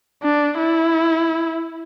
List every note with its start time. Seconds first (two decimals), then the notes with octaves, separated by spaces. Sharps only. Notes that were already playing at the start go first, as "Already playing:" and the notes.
0.23 D4
0.58 E4